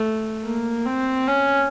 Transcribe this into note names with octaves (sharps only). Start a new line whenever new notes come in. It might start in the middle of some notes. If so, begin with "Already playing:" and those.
Already playing: A3
A#3
C4
C#4